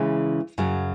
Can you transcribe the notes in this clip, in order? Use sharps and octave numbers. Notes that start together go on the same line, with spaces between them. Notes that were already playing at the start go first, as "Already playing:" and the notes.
Already playing: C#3 E3 G#3 C#4 G#4
F#2 C#3 F#3